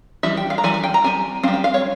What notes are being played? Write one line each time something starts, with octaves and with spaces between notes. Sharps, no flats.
E3 G3 E5
G5
F5
A#5
E3 G3 G#5
G#5
G5
A#5
G3 C4 G#5
G3 C4 F5
G5
F5
C#5